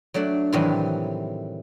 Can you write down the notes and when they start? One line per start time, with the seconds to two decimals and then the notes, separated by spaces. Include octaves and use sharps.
0.14 F#3 A3 D4 E5 F#5
0.52 A2 C3 D#3 E3 F#3 G3